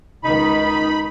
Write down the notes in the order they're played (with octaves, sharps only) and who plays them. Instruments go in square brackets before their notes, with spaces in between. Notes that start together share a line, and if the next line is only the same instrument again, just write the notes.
[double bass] C#2 D#3 [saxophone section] D#4 [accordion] B5